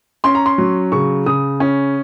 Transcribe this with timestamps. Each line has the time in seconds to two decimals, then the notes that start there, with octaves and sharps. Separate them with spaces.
0.24 C#4 C6
0.35 A#5
0.46 C6
0.58 F#3
0.92 C#3 C#6
1.26 C#3 D#6
1.60 C#4